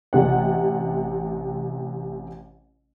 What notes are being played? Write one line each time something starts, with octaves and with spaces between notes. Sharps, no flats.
A1 C3 F#5